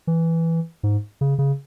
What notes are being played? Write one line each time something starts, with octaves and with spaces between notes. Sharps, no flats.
E3
G#2
C#3
C#3